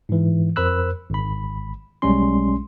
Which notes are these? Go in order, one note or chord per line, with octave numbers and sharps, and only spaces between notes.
G#2 E3
F2 A#4 C5 B5 E6 F#6
G#1 B5
B1 G3 G#3 C#4 C6